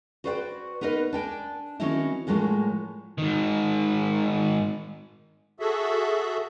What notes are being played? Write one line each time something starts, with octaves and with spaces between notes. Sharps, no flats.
F#4 B4 C5 D5 E5 G5
B3 D#4 A#4 B4 D#5
D4 G5 G#5
D#3 F#3 C4 C#4 D#4 E4
A2 F3 F#3 G#3 A#3
G#2 D#3
F#4 G#4 A4 E5